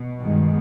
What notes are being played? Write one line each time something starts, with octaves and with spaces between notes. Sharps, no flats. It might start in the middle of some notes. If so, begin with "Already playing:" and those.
Already playing: B2
G2 D#3 G#3